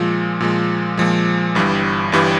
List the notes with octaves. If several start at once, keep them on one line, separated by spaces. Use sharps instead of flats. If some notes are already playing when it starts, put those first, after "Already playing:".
Already playing: A#2 F3 G#3
A#2 F3 G#3
A#2 F3 G#3
G1 G2 E3 G3
G1 G2 E3 G3